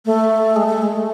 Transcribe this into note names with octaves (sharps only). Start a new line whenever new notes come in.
A3
G#3
A3
G#3
A3